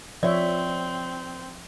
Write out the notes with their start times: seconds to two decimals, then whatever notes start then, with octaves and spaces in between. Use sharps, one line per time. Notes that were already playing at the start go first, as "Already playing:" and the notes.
0.23 F3 C4 C#5 D5 E5